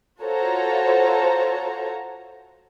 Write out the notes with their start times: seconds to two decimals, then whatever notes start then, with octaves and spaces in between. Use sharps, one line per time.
0.23 F4 F#4 A4 C5 C#5 A#5